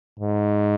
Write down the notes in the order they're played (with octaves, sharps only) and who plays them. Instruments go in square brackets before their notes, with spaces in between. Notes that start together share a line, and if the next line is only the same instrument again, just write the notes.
[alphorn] G#2